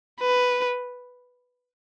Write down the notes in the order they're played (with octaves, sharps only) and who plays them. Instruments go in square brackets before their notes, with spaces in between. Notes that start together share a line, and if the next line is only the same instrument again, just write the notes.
[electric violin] B4